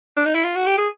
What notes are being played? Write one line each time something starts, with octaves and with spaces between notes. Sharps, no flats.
D4
D#4
E4
F4
F#4
G4
G#4